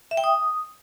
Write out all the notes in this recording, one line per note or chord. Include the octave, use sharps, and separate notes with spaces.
E5
G5
D#6